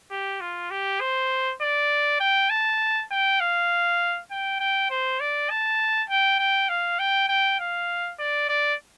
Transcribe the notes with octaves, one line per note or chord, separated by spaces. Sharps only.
G4
F4
G4
C5
D5
G5
A5
G5
F5
G5
G5
C5
D5
A5
G5
G5
F5
G5
G5
F5
D5
D5